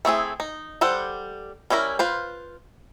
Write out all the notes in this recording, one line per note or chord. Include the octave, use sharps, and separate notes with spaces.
A3 C4 E4 G#4
D#4
G3 A4 C5 F#5
G3 C#4 E4 F#4 A#4
F4 B4 C5